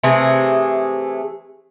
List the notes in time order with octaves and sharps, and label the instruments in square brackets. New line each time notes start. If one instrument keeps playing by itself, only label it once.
[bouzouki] C3 E3 A3 G#4